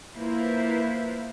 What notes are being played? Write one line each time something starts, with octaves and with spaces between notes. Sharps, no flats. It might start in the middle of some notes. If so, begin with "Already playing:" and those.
A#3 E4 F4 B4 C5